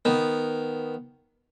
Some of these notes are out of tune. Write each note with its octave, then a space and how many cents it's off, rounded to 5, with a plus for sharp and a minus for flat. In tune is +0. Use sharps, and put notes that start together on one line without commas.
D#3 +0 B3 +0